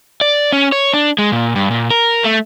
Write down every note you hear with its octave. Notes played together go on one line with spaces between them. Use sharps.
D5
C#4
C#5
D4
G#3
A#2
G2
A#2
A#4
A3